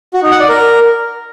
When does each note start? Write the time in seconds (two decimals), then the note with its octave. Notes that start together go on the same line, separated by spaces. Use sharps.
0.14 F#4
0.22 D#4
0.31 F#5
0.40 D5
0.49 A#4